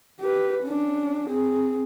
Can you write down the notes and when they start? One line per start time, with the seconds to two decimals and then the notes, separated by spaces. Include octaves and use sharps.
0.21 G4 B4
0.63 C#4 D4
1.29 C4 G#4